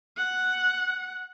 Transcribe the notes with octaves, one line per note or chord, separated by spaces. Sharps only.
F#5